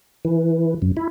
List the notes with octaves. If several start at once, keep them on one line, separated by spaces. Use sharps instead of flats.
E3
F#2
E4